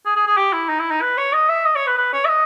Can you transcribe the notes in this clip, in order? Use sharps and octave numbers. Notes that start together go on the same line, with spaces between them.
G#4
G#4
G#4
G4
E4
D#4
E4
D#4
B4
C#5
D#5
E5
D#5
C#5
B4
B4
C#5
E5
D#5